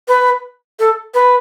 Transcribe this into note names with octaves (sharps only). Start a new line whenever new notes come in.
B4
A4
B4